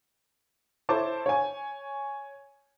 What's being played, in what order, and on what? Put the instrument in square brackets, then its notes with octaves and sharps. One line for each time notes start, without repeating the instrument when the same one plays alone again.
[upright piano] E4 A4 C5 C#5 A5 D6
C#5 G#5